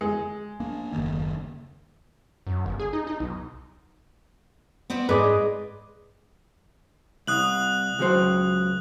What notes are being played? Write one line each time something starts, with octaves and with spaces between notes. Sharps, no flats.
G#3
A#3 D4
F#1 D#2
F#2
G1
G#4
D#4
D#4
B1
B3 C4 D5
G#2 G#3 B4 D5 D#5
C2 D#6 F#6 F#7
C#2 F#3 C5